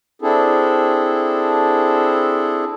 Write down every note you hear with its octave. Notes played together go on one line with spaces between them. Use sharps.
C4 D4 E4 G#4 A4